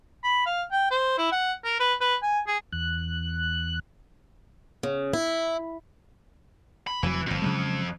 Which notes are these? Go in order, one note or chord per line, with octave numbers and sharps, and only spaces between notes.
B5
F5
G5
C5
E4
F#5
A#4
B4
B4
G#5
G#4
E2 F#6
C#3
E4
B5
F1 F2 E3 F#3
G1 F2 A#2
C#3 F#3 G#3